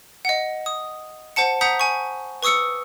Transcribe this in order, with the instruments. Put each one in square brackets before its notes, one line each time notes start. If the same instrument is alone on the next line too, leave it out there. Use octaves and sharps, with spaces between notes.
[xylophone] D#5 F#5
D#6
C5 F#5 A5 C#7
F#5 A#5 D#6 G6 B6
G#5 C#6
B4 C#6 D#6 E6 C#7